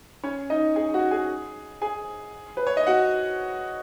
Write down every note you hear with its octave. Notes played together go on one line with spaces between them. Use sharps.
C#4 C#5
D#4 D#5
G#4 G#5
F#4 F#5
G#4 G#5
G#4 G#5
B4
C#5
D#5
F#4 F#5